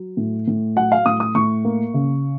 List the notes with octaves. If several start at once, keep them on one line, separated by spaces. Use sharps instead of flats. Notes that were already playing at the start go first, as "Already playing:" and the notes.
Already playing: F#3
A2
A2
F#3 F#5
F5
A2 D#6
D#6
A2 C#6
A#3
C#3